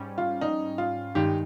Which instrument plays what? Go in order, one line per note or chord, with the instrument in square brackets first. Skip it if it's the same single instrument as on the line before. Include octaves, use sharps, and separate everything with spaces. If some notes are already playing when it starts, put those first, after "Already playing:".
Already playing: [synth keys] G#2 G3 C#4
[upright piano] F4
D#4
F4
[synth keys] G2 D#3 G#3 D#4 [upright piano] G4